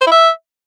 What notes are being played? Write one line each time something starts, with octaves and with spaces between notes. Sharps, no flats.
C5
E4
E5